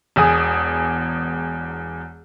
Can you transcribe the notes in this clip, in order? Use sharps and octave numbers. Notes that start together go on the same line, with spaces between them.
E1 E2 G#4 D#6